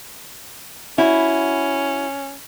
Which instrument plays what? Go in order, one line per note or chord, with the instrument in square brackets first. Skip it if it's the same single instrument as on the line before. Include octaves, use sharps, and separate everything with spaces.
[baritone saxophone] C#4 [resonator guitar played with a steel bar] E4 F#4